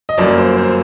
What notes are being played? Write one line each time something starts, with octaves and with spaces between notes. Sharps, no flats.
D#5
G1 F#2 F#3 A#3 D5
C5
C5